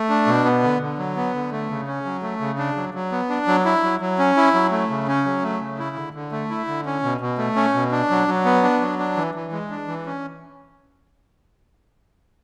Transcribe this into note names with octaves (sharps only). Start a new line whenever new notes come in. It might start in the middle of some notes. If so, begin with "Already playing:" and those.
Already playing: A3
D4
B2
B3
D3
D3
F#3
B3
D3
A3
C#3
C#4
F#3
A3
C#3
D4
F#3
F#3
B3
D4
F#3
E4
F#3
F#3
C#4
E4
F#3
A3
C#3
C#4
F#3
A3
C#3
E4
D3
D3
A3
E4
D3
C#4
B2
B2
A3
C#4
B2
D4
F#3
F#3
B3
D4
F#3
D4
E3
E3
G#3
D4
E3
C#4